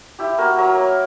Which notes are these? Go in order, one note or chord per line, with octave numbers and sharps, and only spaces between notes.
E4 G4
A#3 F#4 A#4
F#3 A#4 C#5
A#3